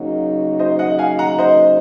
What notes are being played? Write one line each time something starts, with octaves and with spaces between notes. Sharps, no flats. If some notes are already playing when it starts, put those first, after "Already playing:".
Already playing: C#3 F#3 A#3 D#4 F#4
C5 D#5
D#5 F#5
F5 G#5
F#5 A#5
C5 D#5